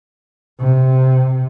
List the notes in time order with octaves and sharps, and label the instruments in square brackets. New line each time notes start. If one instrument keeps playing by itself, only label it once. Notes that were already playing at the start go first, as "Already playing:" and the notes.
[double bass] C3